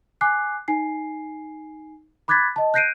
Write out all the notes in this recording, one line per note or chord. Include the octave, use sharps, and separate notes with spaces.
G#5 D6 F#6 C7
D#4 G#5 C7
B5 D6 F#6 G#6 A6 B6
D#5 A5
F#6 G6 A#6 C7 D7 D#7